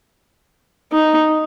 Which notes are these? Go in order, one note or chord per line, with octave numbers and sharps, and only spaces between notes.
D#4